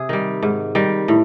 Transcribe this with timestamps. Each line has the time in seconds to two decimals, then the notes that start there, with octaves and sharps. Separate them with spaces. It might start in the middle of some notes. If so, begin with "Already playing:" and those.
Already playing: C3 G#4
0.09 D#3 G3
0.43 G#2
0.75 D#3 G3
1.08 A2